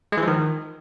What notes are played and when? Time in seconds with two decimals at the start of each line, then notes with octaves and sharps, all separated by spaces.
0.12 G#3
0.17 E3
0.22 F3
0.28 D#3